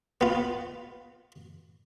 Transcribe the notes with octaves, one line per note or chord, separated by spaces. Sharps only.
B3 F4